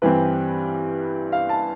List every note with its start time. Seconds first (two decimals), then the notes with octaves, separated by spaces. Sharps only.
0.02 G2 E3 G3 C4 B4
1.32 F5
1.49 A5